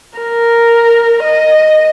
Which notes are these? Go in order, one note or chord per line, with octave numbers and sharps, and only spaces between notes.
A#4
D#5